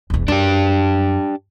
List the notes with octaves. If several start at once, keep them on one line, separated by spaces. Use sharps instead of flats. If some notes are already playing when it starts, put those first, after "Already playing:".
E1 E2
F#2 D4 G4